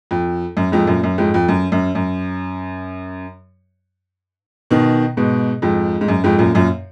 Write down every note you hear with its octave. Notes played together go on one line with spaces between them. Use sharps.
F2
F#2
F2 G#2
F#2 A#2
F#2
F2 G#2
F2
F#2
F#2
F#2
B2 D#3
G#2 B2
F2 G#2
G#2
F#2
F2 G#2
F#2 A#2
F#2 A#2